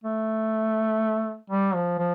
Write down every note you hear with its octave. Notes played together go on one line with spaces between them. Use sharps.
A3
G3
F3
F3